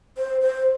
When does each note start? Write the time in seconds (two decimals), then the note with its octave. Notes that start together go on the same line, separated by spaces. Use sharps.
0.18 C5
0.41 C5